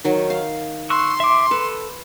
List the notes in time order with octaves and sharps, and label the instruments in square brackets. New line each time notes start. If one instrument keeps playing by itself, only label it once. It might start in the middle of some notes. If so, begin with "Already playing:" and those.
[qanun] D#3 F#3
F5
[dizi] C6 [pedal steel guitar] C#6 E6 F#6
[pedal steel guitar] E5 D6
[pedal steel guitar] A4 [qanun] B4